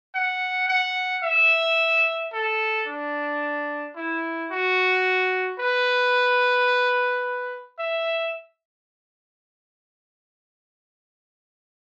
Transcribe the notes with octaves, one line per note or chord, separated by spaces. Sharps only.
F#5
F#5
E5
A4
D4
E4
F#4
B4
E5